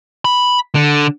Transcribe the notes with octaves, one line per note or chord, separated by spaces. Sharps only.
B5
D3